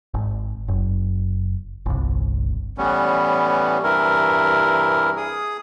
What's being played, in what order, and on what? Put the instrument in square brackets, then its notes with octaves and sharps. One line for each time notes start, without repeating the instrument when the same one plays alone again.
[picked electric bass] G#1
F#1
G1 C2
[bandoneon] A2 E3 G3 B3 C#4
G2 C3 E3 E4 A#4
G#4 D#6